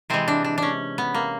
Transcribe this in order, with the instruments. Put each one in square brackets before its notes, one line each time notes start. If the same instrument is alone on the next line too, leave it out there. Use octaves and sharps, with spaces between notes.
[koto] C3 E3 G#3 C4
D4
D4
C#4 D4
B3
A#3